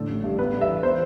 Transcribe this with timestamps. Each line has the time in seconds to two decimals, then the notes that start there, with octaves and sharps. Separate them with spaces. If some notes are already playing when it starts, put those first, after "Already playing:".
Already playing: A2 D3 A4
0.09 A1
0.24 G2
0.39 B3 B4
0.54 G2
0.61 E5
0.69 E3
0.83 B3 C5